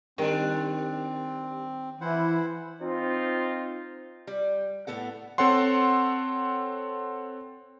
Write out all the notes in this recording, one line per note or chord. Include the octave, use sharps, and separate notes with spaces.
D#3 G3 C4 D4
E3 E4 C5 F#5
C4 D#4 F4
G3
A2 B3 A4 F#5
C4 A4 C#5 F#5 C6